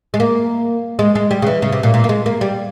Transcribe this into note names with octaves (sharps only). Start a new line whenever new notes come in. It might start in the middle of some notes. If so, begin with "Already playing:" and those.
G#3
A#3
G#3
G#3
G3
C#3
E3
C#3
C3
A#2
A#2
A#3
G#3
A#3
G3